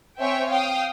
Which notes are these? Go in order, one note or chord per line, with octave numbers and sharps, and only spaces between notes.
C4 C#5 E5 G5 G#5
F5 G5 D#6